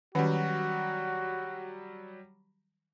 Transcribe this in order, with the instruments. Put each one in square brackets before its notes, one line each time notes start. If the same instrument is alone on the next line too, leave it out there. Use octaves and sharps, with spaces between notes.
[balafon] D#3 C#4 F#5 [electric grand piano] F#3 G3 [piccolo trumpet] F#4